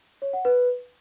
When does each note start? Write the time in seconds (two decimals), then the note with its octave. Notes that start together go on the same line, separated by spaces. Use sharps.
0.22 C#5
0.33 F#5
0.45 B4